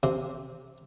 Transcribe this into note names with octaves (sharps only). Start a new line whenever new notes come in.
C3